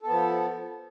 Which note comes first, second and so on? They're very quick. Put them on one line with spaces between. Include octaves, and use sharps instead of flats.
A4 B3 F3